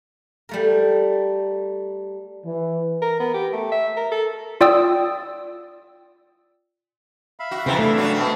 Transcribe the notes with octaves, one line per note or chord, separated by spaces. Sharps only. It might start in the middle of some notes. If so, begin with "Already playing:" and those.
G3 A3 A#4
E3
A#4
B3
G4
A3
E5
A#4
A4
F4 D5 G5 D#6 E6
E5 F5 B5
F#4
G#2 C#3 E3 F3 C4 E4
E3 A3 D4
F#2 C#3 F#4
B2 C4